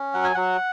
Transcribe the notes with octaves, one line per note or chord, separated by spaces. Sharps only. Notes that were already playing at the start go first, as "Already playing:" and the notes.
Already playing: C#4
F#3 F#5
G#5
F#3 F#5